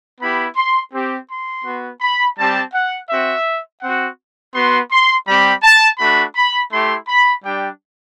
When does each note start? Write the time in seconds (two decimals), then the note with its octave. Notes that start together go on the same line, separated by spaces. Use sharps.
0.20 B3 E4 G4 B5
0.56 C6
0.92 C4 G4
1.29 C6
1.65 B3 F#4
2.01 B5
2.37 G3 C4 G4 A5
2.73 F#5
3.10 C4 F#4 E5
3.82 C4 F#4 F#5
4.54 B3 F#4 C6
4.91 C6
5.27 G3 C4 G4 B5
5.63 A5
5.99 A3 D4 F#4 B5
6.35 B5
6.71 A3 E4 G4 C6
7.07 B5
7.43 G3 D4 G4 G5